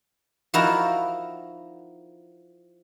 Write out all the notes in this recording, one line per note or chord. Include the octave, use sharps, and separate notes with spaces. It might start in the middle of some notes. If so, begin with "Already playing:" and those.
F3 D#4 E4 F#4 A#4 A#5